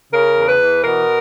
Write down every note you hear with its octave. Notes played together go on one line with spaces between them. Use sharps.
C#3 A#4
E2
B4
E3
B2 A#4